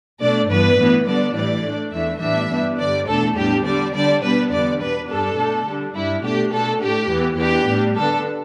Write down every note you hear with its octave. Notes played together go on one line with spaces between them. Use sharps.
B2 A3 D4 D5
G2 E3 B3 D4 B4
A2 E3 B3 D4
D3 G3 B3 D4 D5
A2 E3 G3 D5
A2 A3 D4
E2 E3 A3 D4 E5
A2 E3 G3 B3 D4 E5
G2 G3 B3 D4
G2 D3 G3 D5
E2 B2 A3 D4 A4
A2 G3 B3 D4 G4
D3 G3 D4 D5
D3 G3 D4 D5
B2 G3 B3 D4 B4
E2 D3 G3 B3 D5
B2 B3 D4 B4
G2 G3 D4 A4
B2 A3 D4
D3 G3 D4
G2 G3 D4 E4
B2 A3 D4 G4
B2 A3 D4 A4
A2 A3 D4 G4
E2 E3 B3
E2 E3 B3 D4 G4
A2 G3 D4
D3 B3 D4 A4